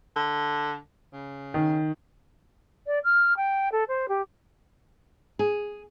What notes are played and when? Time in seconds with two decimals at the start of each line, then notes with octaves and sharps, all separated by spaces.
0.16 D3
1.13 C#3
1.54 D#3
2.86 D5
3.04 F6
3.36 G5
3.71 A4
3.88 C5
4.08 G4
5.39 G#4